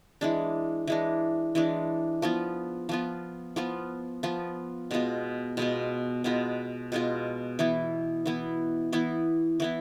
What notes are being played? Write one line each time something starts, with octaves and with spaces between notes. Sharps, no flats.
E3 G#3 D4
E3 G#3 D4
E3 G#3 D4
F3 B3 F4
F3 B3 F4
F3 B3 F4
F3 B3 F4
B2 G#3 B3 F4
B2 G#3 B3 F4
B2 G#3 B3 F4
B2 G#3 B3 F4
E3 B3 E4
E3 B3 E4
E3 B3 E4
E3 B3 E4